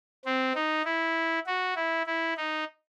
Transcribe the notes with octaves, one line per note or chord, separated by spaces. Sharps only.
C4
D#4
E4
F#4
E4
E4
D#4